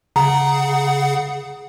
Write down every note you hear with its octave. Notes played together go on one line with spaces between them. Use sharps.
C#3 G#4 F#5 A#5